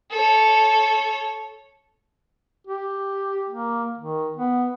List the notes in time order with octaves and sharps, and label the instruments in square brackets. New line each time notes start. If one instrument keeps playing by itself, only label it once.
[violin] A4 C#5
[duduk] G4
A#3
D#3
B3